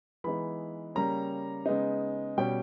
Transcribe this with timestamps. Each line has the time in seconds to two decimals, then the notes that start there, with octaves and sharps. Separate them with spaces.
0.24 E3 G#3 B3 D#4 B5
0.95 C#3 G3 A#3 C#4 A#5
1.66 C#3 G#3 B3 D#4
2.38 B2 G3 C#4 G5